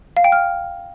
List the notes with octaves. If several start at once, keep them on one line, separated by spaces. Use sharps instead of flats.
F5
G5
F6